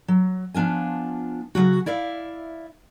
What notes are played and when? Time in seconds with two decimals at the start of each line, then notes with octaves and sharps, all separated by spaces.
0.08 F#3
0.54 F3 B3 D4 F4 G#5
1.55 C#3 E3 F#3 F#4
1.86 E4 D5 E5 F5